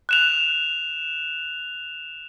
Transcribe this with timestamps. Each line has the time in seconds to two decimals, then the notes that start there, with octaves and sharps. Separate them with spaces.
0.09 F#6 E7 F7